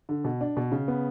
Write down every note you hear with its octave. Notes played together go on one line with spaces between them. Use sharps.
D3
B2
D4
B2
C#3
B3